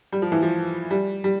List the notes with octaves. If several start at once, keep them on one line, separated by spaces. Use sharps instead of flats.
G3
F3
E3
F3
G3
G3